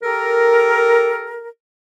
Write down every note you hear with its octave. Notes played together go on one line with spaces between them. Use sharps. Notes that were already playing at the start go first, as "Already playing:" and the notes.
G4 A4 A#4